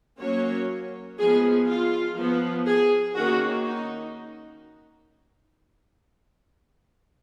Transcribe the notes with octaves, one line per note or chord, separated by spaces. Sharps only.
F#3 A#3 C#4 C#5
F3 G#3 B3 G#4
F4
F3 B3
G#4
D#3 A#3 C#4 F#4
D#4